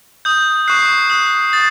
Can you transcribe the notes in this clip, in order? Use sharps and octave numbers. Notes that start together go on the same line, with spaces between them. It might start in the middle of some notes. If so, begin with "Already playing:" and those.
D#6 G6
C#6 F#6 C7
D#6 F#6
D#6 A6